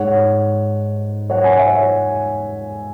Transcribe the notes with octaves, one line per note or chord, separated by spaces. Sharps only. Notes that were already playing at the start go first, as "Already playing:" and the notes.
Already playing: G#2 G#3 C#5 F#5
C#5 F#5
G#5
F#5
E5
C#5